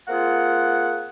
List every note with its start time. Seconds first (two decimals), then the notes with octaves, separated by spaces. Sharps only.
0.09 A#3 C4 F4 G#4 F#5